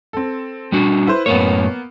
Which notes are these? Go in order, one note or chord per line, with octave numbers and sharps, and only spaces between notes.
C4 A4
G3 D4 F#4
E4 B4 C5
F#2 A2 A#3 B3 C#5